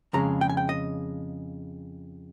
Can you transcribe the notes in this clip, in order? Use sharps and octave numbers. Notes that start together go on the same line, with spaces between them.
F2 C#3 G#3 A#5
G5
G#5
G5
D#5